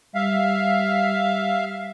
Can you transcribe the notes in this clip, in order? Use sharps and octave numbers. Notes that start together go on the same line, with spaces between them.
G3 E5 F5